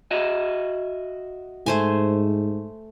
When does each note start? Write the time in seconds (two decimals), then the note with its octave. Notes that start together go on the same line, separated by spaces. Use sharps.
0.11 F#4 D#5 E5
1.66 G#2 A3 C5 G#5